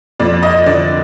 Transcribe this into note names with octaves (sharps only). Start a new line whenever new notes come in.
F2 D5
D#5
D3 D5